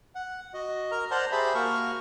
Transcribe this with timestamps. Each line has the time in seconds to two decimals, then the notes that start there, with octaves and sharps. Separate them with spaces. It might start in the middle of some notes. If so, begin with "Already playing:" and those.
0.15 F#5
0.54 F#4 D#5
0.91 A#4 A#5 F6
1.11 C5 D5 F#5 A5 A#5 C6
1.32 G4 G#4 C5 E5 A5 B5
1.55 A#3 F#4 A#4 C#6 F6